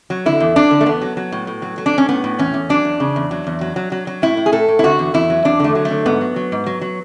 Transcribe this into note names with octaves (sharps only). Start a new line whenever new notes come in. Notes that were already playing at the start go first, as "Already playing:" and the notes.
F#3
D3 E4
E2
F#3 D4
D3
A3
E2 B3
F#3
F#3
A2
A2
F#3
F#3
D4
F#3 C#4
A2 B3
A2
E2 C#4
E2
F#3 D4
E2
C#3
E2
F#3
E2
F#3
F#3
F#3
F#3
A2 E4
A2
G#4
A2 A4
A2
E4
D3 F#4
E2
E2 E4
F#3
E2 D4
D3 A3
F#3
A3
D3
G#2 B3
F#3
F#3
G#2
F#3
F#3